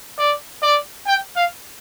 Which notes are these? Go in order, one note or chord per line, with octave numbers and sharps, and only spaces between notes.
D5
D5
G5
F5